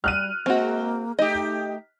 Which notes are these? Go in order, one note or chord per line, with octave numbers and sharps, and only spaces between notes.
G3 F6 F#6 D#7
G#3 A#3 C4 F#4
A3 D#4 G4 D#5